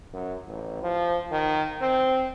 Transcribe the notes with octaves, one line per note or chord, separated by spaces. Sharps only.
F#2
A1
F3
D#3
C4